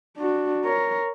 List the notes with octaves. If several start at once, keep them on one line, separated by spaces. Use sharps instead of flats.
D4 F#4
A#4 C#5